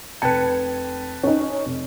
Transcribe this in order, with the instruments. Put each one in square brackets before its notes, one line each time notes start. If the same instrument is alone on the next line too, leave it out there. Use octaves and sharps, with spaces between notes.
[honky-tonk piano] F1 G#6 C#7 [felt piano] B4 G5 A5
[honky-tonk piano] C#4 D#4
F1